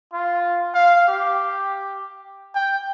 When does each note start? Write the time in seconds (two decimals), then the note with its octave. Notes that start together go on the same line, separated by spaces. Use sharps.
0.13 F4
0.75 F5
1.08 G4
2.55 G5